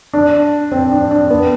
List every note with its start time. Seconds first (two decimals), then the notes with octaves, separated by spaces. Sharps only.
0.13 D4
0.72 C4
0.91 D4
1.11 D4
1.30 B3